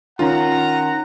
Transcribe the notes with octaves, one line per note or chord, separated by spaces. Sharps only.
D#3 C#4 F4 F#5 A#5